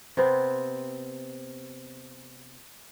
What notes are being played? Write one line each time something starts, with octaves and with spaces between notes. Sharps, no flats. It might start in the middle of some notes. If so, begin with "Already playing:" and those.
C3 B3 C4